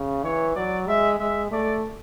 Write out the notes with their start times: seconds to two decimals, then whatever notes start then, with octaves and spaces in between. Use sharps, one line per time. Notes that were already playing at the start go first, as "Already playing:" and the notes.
Already playing: C#3
0.24 E3 C#5
0.55 F#3 D5
0.87 G#3 E5
1.19 G#3 E5
1.51 A3 D5